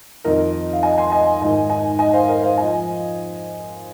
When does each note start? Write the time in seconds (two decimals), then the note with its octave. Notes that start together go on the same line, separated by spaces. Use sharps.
0.24 F2 D#3 A#4 D#5
0.73 F5
0.83 D#5 G#5
0.98 G#5 C6
1.12 D#5 G#5
1.41 G#2 D#3 D#5 G#5
1.70 D#5 G#5
1.99 D#5 G#5
2.13 C5 F5
2.28 A#4 D#5
2.43 C5 F5
2.58 F3 D#5 G#5